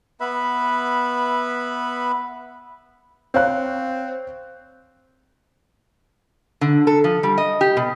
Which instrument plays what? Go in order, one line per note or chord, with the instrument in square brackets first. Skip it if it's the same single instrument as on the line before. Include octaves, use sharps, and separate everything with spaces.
[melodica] B3 B4 E5 B5
[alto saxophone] C4 [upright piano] C#5 F5 F#6
[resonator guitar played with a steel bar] D3
A4
F3
G3
D#5
G4
B2